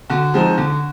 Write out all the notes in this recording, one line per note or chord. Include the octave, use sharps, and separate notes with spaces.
D3 F#4
F3 G#3 C4 D#4
D3